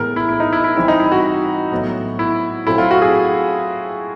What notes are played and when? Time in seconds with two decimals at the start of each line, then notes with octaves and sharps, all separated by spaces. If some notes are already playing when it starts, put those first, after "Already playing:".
Already playing: A2 E3 G#3 B3 A#4
0.16 E4
0.29 E4
0.40 D#4
0.53 E4
0.64 E4
0.76 E3 G3 C4 E4
0.88 D#4
1.00 E4
1.12 F#4
1.72 A2 F#3 B3
2.19 E4
2.67 A#2 F#3 A3 C4 E4
2.78 F4
2.91 F#4
3.02 G#4